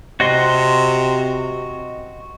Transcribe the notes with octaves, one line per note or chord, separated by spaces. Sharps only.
C3 F#4 D#5 C6